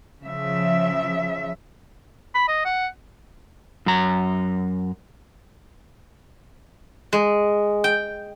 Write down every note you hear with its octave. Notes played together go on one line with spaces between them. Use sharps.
C#3 F3 E5
B5
D#5
F#5
F#2 A#5
G#3
G5